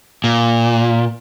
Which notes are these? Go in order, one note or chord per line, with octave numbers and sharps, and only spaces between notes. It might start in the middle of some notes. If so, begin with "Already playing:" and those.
A#2